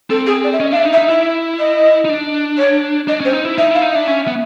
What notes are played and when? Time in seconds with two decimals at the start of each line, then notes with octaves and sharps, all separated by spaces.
0.10 C4 A4
0.26 G#4
0.44 D5
0.53 E5
0.60 C#4 D#5
0.72 D4 E5 F5
0.86 D#4
0.93 E5
0.98 D#4
1.09 E4 E5
1.59 D#5
2.05 D#4
2.09 D4
2.58 C#5
3.08 D4 D#5
3.20 C#4 C5
3.33 D#4
3.45 E4
3.58 D#4 E5
3.71 E4 F5
3.82 D#4
3.91 D4 E5
4.08 C#4
4.27 B3